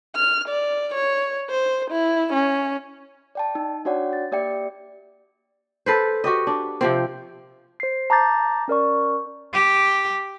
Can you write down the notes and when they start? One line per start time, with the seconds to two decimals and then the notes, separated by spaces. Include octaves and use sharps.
0.16 F6
0.49 D5
0.94 C#5
1.50 C5
1.90 E4
2.33 C#4
3.35 D5 G5 A5
3.55 D#4
3.85 D4 F#4 C#5 D5 F#5 G5
4.13 A6
4.32 A#3 G4 D5 E5 G5 C#7
5.86 A4 B4 C5
6.24 F#4 G4 D#5
6.47 D4
6.81 C3 F3 C4
7.80 C5 C7
8.10 A5 A#5 D6 G6 A6
8.68 C#4 A#4 D5 C#6
9.53 G4